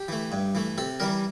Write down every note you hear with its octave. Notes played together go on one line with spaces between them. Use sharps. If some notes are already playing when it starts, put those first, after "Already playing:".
Already playing: G4
E3 A3
G2
E3 A3
C3 A4
E3 G3 A#4